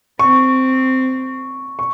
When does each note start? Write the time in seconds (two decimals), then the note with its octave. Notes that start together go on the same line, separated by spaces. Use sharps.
0.19 C4 C#6
1.79 C#6